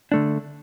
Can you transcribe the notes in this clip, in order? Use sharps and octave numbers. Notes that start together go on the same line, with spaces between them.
D3 A3 D4